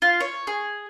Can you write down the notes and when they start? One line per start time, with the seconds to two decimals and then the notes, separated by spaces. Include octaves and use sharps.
0.02 F4
0.20 C#5
0.47 G#4